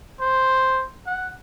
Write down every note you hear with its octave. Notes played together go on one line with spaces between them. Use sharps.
C5
F#5